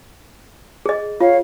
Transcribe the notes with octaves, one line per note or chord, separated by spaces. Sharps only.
G#4 D#5
F4 C#5 F5